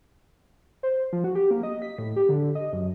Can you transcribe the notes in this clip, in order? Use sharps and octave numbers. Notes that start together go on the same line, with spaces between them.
C5
F3
F#4
G4
A#3
D#5
B6
A2
G4
D3
D#5
F#2